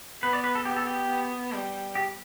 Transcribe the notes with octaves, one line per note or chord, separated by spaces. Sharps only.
B3 B4
D5
B4
A4
B3 G4
A4
G4
B3
G3
G4